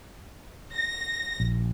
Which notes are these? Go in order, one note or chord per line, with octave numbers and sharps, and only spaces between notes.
A#6
A#1